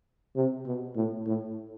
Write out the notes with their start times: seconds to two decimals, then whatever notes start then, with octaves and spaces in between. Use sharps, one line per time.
0.36 C3
0.66 B2
0.96 A2
1.26 A2